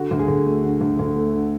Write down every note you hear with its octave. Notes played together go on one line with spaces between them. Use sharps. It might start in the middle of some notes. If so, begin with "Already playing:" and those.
Already playing: D3 F#4
D2
G#4
D2
A3
D3
D2
D2
A3
D3